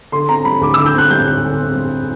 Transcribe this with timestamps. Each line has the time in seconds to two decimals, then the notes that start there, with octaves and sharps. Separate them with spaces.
0.12 D3 C6
0.29 C4 A#5
0.45 G3 B5
0.61 D2 D6
0.74 E6
0.78 D3
0.86 G6
0.94 C4 F#6
1.10 G3 G6
1.27 D2
1.43 D3
1.60 C4
1.75 G3